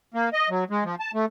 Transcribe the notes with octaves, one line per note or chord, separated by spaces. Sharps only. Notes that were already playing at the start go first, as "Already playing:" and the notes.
A#3
D#5
F#3
G#3
F3
A5
A3